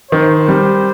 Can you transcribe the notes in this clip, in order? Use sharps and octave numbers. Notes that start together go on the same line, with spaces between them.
D#3 C5
G3